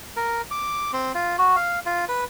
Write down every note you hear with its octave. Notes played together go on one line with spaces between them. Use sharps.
A#4
D6
C4
F4
F#4
F5
F4
B4